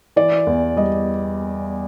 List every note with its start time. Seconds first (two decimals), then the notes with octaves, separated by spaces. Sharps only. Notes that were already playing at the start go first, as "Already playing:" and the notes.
0.16 E3 D5
0.47 E2
0.76 G3 D#5